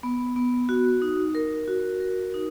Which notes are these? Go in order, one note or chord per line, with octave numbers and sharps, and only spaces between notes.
B3
B3
F#4
D#4
A#4
F#4
A#4
D#4